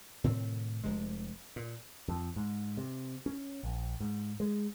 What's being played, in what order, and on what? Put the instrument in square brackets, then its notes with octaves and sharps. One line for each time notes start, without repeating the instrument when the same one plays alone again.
[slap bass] A2 C3 D#3 C4
F1 C3 G#3
A#2
[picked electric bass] F2
G#2
C3
C#4
A#1
G#2
G#3